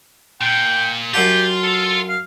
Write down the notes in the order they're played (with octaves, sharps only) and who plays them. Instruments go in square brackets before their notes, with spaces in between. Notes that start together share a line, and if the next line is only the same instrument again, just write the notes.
[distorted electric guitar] A#2 [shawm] G5
[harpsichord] F#2 F#5 A5 [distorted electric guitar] F4 [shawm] G4
[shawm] A4
F5